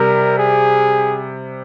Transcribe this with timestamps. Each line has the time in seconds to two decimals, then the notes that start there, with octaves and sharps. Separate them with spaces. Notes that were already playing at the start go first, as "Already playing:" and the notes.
Already playing: C3 G3 A#4
0.38 G#4